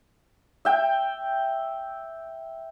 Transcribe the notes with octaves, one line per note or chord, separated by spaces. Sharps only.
E5 G5